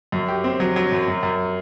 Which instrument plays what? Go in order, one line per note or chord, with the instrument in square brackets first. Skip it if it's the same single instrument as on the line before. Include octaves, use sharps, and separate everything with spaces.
[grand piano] F#2
G4
C4
F#3
F#3
F#2
F#2
F#2